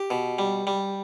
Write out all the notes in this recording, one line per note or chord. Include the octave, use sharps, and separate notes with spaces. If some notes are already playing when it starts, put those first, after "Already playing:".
Already playing: G4
B2
G3
G3